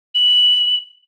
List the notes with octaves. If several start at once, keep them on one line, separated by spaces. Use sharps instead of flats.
F#7